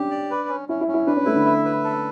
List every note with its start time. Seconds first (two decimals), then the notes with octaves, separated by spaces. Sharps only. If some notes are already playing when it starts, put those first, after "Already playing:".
Already playing: C#4 D4 G4
0.10 D5
0.31 B4
0.49 C#4
0.69 C#4 E4
0.81 E4
0.88 C#4
0.94 E4
1.07 D4 B4
1.16 C#4
1.25 A3 E4
1.35 D3
1.46 E5
1.65 B4
1.84 A4